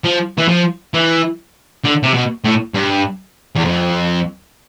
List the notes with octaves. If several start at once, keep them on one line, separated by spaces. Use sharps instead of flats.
F3
E3
F3
E3
D3
C3
B2
A2
G2
E2
F2